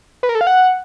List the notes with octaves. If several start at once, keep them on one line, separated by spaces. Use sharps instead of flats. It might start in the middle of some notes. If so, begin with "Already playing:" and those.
B4
A#4
A4
F5
F#5